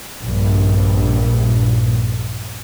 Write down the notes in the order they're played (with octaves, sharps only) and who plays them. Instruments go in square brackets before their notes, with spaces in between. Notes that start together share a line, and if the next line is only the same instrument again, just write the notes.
[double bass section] A#1 G2